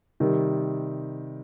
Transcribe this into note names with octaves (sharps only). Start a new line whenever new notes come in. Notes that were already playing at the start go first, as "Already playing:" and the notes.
C3 D#3 G3